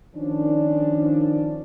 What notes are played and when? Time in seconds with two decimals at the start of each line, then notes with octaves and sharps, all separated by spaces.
0.15 D#3 F3 C#4 D4